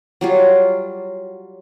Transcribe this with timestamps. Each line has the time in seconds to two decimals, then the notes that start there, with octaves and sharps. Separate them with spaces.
0.21 F#3 G3 F4